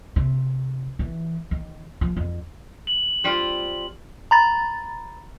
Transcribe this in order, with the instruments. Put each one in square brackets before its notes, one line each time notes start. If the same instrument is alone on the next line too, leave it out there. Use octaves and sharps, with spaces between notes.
[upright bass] C3
E3
D#3
F3
F2
[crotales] F#7
[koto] G3 C4 F4
[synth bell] A#5 B5 A6